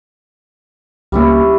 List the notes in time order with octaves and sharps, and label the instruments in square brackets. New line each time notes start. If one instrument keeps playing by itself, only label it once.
[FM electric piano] C#2 A#3 [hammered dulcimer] G3 C#4 E4